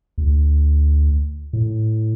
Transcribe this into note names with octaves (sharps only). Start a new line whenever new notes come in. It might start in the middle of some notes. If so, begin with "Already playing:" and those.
D2
A2